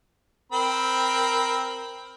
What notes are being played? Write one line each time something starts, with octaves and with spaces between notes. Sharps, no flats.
C4 A#4 B5